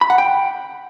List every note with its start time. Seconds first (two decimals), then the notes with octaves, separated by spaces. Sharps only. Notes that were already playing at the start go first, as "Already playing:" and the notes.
0.01 B5
0.10 F#5
0.18 G5